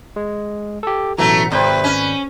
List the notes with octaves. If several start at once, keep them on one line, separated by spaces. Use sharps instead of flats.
G#3
G4 A4
A1 B2 E3 F#3 A3 A#5
G#1 C3 B4 D5 G6
C#4